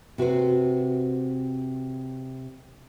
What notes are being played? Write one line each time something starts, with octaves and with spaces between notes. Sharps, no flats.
C3 F#4 B4 C5